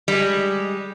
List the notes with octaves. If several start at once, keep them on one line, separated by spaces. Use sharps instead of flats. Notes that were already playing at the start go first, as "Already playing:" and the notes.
G3 G#3